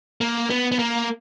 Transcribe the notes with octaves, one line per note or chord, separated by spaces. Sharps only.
A#3
B3
B3
A#3